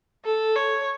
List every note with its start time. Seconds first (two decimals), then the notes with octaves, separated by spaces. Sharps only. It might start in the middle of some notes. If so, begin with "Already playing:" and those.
0.25 A4
0.56 C#5